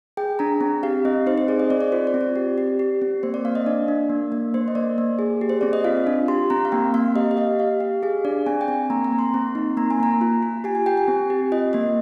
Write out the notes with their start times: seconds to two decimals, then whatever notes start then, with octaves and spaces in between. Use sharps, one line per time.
0.17 G#4 G5
0.39 D4 A#5
0.61 C4
0.83 G4 F5
1.05 C4 D#5
1.26 D#4 C5
1.38 C5
1.48 G#4 D5
1.60 D#5
1.70 C4 D5
1.81 D5
1.92 F4 C5
2.07 D5
2.14 C4
2.21 D5
2.36 G4
2.58 G4
2.79 G4
3.02 C4
3.23 A#3 C5
3.34 D5
3.45 A#3 F5
3.55 D#5
3.66 D4 D5
3.88 D4
4.10 A#3
4.32 A#3
4.54 A#3 C5
4.68 D#5
4.75 A#3 D5
4.98 A#3
5.19 G#4
5.41 G4
5.49 C5
5.61 C4 D5
5.73 D#5
5.84 F4 F5
6.07 D4
6.28 G4 C6
6.50 C4 A#5
6.65 F5
6.72 A#3 G5
6.94 A#3 F5
7.15 G4 D#5
7.31 D#5
7.37 G4 F5
7.59 G4 F5
7.80 G4
8.03 G#4 F5
8.25 D4 D5
8.47 C4 G#5
8.61 G5
8.68 C4 G#5
8.90 A#3 A#5
9.04 A#5
9.12 A#3
9.19 C6
9.34 C4
9.55 D#4
9.77 A#3 A#5
9.91 G#5
10.00 A#3 A#5
10.21 F4
10.43 F4
10.64 G4 G#5
10.75 G#5
10.86 G4 G5
10.97 G#5
11.08 C4
11.30 G4
11.52 F4 D#5
11.73 A#3 D#5